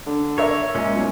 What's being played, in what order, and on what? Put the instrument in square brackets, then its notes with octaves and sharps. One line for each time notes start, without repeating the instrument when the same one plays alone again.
[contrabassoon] D3
[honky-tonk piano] A#4 E5 [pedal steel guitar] C#5
[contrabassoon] A#2 [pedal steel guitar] G#3 C#4
[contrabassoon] B1